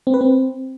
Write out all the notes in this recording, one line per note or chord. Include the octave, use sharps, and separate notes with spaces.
C4
B4
C4